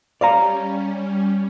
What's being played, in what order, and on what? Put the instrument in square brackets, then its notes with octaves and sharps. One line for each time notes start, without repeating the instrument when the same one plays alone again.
[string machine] G3 C#4 [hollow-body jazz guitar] D5 F5 A#5